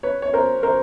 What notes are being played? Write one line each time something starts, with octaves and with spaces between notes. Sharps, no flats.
B4 C#5
C#5
A#4 C5
A#4 C5